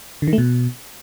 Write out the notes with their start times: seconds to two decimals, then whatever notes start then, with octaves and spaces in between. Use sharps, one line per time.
0.22 D3
0.28 D#3
0.33 A3
0.38 B2